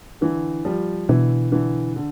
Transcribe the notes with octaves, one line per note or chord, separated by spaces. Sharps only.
D3 E3
F3 G3
B2 D3 E3
D3 E3
D3